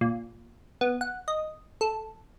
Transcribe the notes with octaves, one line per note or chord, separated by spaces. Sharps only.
A#2
B3
F#5
D#5
A4